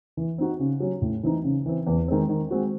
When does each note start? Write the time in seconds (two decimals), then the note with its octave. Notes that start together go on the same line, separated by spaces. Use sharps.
0.17 E3
0.38 C4 D#4 F#4
0.59 C#3
0.80 F#3 C#4
1.02 A2
1.23 E3 C4 D#4
1.44 C#3
1.66 E3 C4
1.87 E2
2.08 D#3 G#3 C4
2.29 D#3
2.51 G#3 C4 F#4